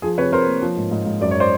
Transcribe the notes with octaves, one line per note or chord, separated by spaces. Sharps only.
F3 G#4
C3 B4 C#5
C3 A#4 C5
A#3
F3
G#2
G#2
G#2
F#2 D5
C#5
C5 D5